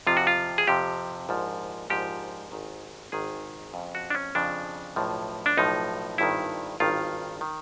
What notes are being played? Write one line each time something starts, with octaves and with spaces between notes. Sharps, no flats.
F2 C3 F3 F4
F#4
F4
G#4
F2 C3 F3 G4
A#1 G#2 F3
A#1 G#2 F3 G4
G#1 G#2 D#3
G#1 G#2 D#3 G#4
F2 C#3 F3
F#4
D4
C#4
F2 C#3 F3 D4
B1 A2 F3
D4
B1 A2 F3 D#4
G#1 G2 D#3 E4
G#1 G2 D#3 F4
D#3